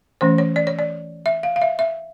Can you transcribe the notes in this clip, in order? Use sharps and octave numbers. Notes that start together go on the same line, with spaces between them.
E3 A3 C#4 C5
C#5
D5
C#5
D5
E5
F5
F5
E5
E5